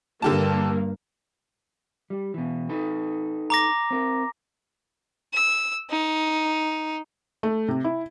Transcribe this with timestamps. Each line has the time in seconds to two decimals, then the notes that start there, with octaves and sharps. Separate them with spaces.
0.22 G2 D3 A#3 G4 A5
2.10 G3
2.34 B2 E3
2.69 D#4 A4 B4
3.50 A#5 D6 A#6
3.91 C4 A#4
5.34 E6
5.90 D#4
7.43 A3
7.68 C3
7.84 E4